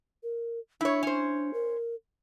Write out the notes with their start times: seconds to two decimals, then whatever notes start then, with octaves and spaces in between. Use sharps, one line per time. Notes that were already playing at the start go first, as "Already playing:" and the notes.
0.23 A#4
0.81 D4 E4 C#5
1.03 C#4 C5
1.54 A#4